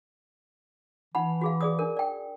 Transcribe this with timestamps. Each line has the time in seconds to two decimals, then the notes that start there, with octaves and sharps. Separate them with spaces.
1.15 E3 D#4 F#5 B5
1.41 F#4 G#4 F5
1.61 G#4 D5 D#6
1.79 D4 A#4
1.97 D5 G5